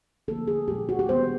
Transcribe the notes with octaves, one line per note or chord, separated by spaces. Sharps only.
D3 F3 A#3 A4
G#4
A#2 F3 G#3 G4
F#4
G4
D#3 G#3 B3 C5